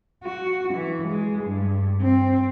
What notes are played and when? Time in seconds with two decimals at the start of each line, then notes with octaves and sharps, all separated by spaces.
0.24 F#4
0.74 E3
1.08 G#3
1.44 G2
2.01 C4